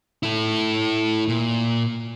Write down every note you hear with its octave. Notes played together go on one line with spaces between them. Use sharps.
E4 A4
A#2